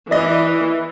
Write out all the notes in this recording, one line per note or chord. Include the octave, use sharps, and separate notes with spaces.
E3 D5 D#5